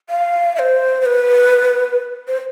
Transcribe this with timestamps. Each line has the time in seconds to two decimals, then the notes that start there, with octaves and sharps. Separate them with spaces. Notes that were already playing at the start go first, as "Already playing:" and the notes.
0.10 F5
0.56 E5
0.59 C5
1.01 C5
1.06 B4
2.28 C5